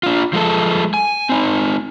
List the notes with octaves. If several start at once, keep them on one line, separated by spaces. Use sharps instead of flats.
D4 F4
F3 G#3 A4
G#5
C4 D#4